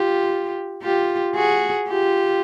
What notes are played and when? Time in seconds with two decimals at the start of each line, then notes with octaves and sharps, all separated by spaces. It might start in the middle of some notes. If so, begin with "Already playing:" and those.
Already playing: F4 G4
0.82 F4 G4
1.35 F#4 G#4
1.88 F4 G4